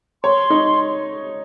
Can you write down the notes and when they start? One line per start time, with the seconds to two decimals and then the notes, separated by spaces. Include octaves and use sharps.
0.24 C#5 C6
0.50 D#4